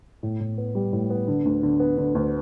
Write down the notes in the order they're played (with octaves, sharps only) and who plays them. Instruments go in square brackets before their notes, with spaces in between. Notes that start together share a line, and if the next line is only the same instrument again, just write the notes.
[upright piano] A2
A2
B3
G3
A2
B3
D3
D2
D3
B3
D3
D2